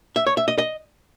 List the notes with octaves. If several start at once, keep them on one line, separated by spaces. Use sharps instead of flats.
E5
C#5
E5
D#5
D#5